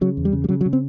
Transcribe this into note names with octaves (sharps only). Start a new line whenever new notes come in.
C#3 F#3
E2
G3
C#3
G3
C#3 F#3
F#3
C#3
C4